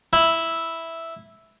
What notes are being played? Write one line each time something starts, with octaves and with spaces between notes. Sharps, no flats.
E4